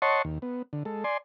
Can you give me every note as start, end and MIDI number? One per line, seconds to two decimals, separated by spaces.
0.02 0.22 73
0.02 0.22 75
0.02 0.22 78
0.02 0.22 81
0.02 0.22 84
0.02 0.22 85
0.25 0.39 39
0.42 0.62 59
0.73 0.83 50
0.85 1.04 56
0.85 1.04 69
1.04 1.17 74
1.04 1.17 80
1.04 1.17 84